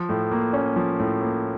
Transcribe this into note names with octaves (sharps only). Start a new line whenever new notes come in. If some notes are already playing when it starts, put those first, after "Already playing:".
Already playing: F3
A2
A#3
C#4
F3
A2
A#3